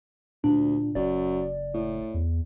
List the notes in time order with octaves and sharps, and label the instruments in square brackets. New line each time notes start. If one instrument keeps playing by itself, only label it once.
[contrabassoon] D2 [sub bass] A#2 [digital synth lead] D4
[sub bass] F#1 [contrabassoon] F#2 [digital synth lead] D5
[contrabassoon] A2
[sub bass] E2